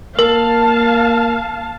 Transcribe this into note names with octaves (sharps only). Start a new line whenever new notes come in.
A#3 A#4 F5 A5